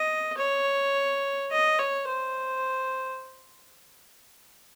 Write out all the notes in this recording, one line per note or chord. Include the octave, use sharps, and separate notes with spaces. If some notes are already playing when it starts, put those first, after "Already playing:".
Already playing: D#5
C#5
D#5
C#5
C5